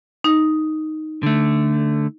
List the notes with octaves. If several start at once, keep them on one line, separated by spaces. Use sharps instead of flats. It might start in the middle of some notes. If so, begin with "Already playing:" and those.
D#4
D3 A3